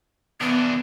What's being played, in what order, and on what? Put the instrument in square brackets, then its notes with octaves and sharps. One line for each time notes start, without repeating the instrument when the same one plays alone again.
[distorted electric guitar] E3 D4 [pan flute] B3